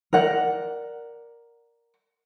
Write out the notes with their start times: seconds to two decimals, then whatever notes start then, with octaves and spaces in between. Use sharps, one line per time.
0.13 A#4 D5 F#5